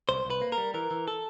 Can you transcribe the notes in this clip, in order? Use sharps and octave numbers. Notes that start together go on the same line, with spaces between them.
C2 C5
C2
B4
A#3
A#4
G3
E3 A#4
E3
A4